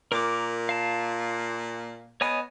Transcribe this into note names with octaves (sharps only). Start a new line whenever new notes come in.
A#2 A#4 D6
F5 A5
B3 C#5 D#5 G#5